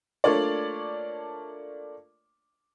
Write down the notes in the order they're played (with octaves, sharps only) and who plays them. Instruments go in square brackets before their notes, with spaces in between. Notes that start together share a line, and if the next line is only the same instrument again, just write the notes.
[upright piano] A3 A#3 D4 F4 C#5 D5